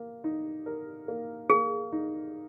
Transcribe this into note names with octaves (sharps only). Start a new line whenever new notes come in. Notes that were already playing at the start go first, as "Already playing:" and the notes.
Already playing: A#3
D#4
A#4
A#3
A#3 G#4
D#4